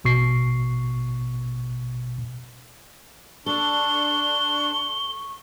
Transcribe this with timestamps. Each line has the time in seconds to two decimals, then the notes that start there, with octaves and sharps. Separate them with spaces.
0.04 A1 B2 C#6 C7
3.46 D4 A4 C#6 G7